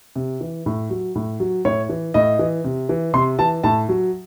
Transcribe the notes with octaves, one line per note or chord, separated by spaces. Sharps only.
C3
E3
A2
F#3
A2
F#3
A2 C#5
E3
A2 D#5
E3
C3
E3
C3 C6
E3 A5
A2 A5
F#3